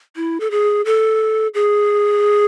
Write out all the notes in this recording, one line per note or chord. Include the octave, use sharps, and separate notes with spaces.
E4
A4
G#4
A4
G#4